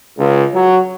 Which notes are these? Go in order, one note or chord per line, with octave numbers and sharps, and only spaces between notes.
C#2
F#3